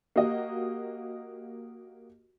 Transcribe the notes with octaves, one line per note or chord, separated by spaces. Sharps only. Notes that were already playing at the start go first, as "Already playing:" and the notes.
A#3 F#4 G4 D#5